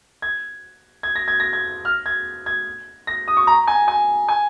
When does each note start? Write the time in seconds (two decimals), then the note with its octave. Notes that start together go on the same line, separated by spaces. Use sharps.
0.22 G#6
1.03 G#6
1.15 A#6
1.28 G#6
1.40 A#6
1.53 G#6
1.85 F6
2.06 G#6
2.46 G#6
3.07 A#6
3.28 D#6
3.37 C#6
3.47 A#5
3.67 G#5
3.88 G#5
4.29 G#5